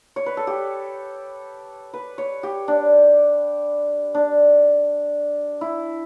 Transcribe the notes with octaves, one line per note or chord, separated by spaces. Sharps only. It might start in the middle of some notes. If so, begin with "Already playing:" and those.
C#5
B4
A4
G4
B4
C#5
G4
D4
D4
E4